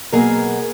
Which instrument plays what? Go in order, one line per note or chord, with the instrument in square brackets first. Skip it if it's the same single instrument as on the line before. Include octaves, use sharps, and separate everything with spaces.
[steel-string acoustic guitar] B2 F#3 A#3 G#4 A#4